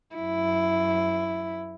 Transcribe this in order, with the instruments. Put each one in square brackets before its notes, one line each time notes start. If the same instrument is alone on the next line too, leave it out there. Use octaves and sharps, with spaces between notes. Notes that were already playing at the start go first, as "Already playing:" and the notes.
[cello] F#2 E4